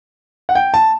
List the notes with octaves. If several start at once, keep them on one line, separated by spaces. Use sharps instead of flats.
F#5
G5
A5